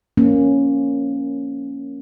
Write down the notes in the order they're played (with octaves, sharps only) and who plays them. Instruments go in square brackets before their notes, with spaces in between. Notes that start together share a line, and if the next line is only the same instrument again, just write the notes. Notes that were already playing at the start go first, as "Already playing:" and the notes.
[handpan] F3 A#3 C#4